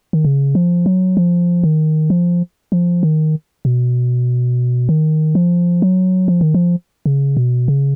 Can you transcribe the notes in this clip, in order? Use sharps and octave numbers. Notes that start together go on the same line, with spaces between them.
D#3
C#3
F3
F#3
F3
D#3
F3
F3
D#3
B2
D#3
F3
F#3
F3
D#3
F3
C#3
B2
C#3